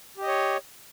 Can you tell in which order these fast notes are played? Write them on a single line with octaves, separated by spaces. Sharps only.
G4 D#5 C#5